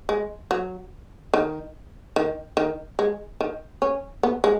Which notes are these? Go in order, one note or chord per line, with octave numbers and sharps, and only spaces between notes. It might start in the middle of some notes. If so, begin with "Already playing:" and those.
G#3
F#3
D#3
D#3
D#3
G#3
D#3
C#4
B3
G#3